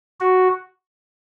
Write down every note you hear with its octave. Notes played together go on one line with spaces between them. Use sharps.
F#4